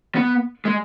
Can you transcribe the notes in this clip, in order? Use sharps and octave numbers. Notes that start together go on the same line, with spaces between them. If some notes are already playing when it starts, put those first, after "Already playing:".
B3
G#3